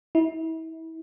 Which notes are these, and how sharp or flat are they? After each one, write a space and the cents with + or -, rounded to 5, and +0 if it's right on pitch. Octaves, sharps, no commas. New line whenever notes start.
E4 -35